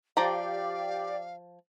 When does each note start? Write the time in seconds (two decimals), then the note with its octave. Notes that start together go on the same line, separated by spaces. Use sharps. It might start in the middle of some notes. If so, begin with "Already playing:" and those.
0.17 F3 G4 D5 F5 A#5